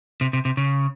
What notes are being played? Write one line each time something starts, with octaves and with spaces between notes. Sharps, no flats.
C3
C3
C3
C#3